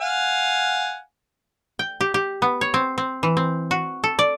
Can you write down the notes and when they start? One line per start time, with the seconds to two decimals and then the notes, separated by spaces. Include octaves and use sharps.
0.01 F5 F#5 G#5
1.79 G5
2.01 G4
2.14 G4
2.42 B3
2.61 C#5
2.74 C4
2.98 C4
3.23 E3
3.37 C4
3.71 F#4
4.04 A4
4.19 D5